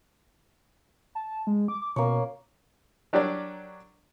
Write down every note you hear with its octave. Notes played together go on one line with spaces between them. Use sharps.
A5
G#3
D6
D6
B2 A#3 C#4 C#5
F#3 D4 G4 A#4 C#5 D5